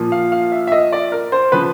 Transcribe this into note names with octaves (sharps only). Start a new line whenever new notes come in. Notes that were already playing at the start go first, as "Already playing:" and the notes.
Already playing: A#2 F3
F5
F5
E5
E5
D#5
D5
A#4
C5
C#3 F3 B4